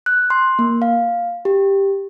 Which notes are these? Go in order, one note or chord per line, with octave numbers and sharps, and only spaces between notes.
F#6
C6
A#3
F5
G4